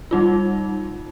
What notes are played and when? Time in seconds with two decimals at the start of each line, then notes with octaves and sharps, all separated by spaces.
0.11 G3 D#4 F4